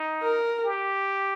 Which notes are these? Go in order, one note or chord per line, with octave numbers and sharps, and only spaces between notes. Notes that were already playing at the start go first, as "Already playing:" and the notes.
Already playing: D#4
A#4
G4